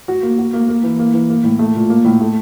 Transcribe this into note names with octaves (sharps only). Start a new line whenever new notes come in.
F#4
A#3
F#4
A#3
A#3
E3
A#3
E3
A#3
A2
A3
A#2
A#3
A2
A3